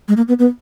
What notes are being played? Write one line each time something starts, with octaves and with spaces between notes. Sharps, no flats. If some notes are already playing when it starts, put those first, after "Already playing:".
G#3
A#3
B3
B3